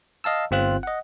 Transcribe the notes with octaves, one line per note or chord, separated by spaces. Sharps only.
D#5 F5 A5 E6
G1 C4 F4 F#6
D#5 F#5